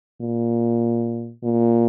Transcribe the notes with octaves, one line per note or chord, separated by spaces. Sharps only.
A#2
A#2